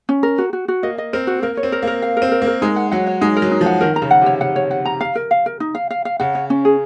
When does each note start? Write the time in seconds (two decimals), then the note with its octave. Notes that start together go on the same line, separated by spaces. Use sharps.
0.09 C#4
0.23 A#4
0.38 F#4
0.53 F#4
0.68 F#4
0.83 A#3 D#5
0.98 D#5
1.13 C4 A#4
1.27 F#4
1.42 A#3 A#4
1.57 C#5
1.63 C4
1.72 A#4
1.82 A#3
1.87 A#4
2.02 F5
2.17 A#4
2.22 C4
2.32 A#4
2.42 A#3
2.47 A#4
2.62 G#3 D#4
2.76 F#5
2.92 F#3 F#5
3.07 C#5
3.21 G#3 D#4
3.37 A#4
3.42 F#3
3.51 D#4
3.61 F3
3.66 F#5
3.81 D#3 A#4
3.96 A#5
4.02 C#3
4.11 F#5
4.22 C3
4.26 C#5
4.41 C#3 F#5
4.56 C#5
4.71 F#5
4.85 A#5
5.01 F5
5.15 A#4
5.31 F5
5.46 A#4
5.60 D#4
5.75 F5
5.91 F5
6.05 F5
6.20 C#3 F#5
6.35 C#5
6.50 C#4
6.65 G#4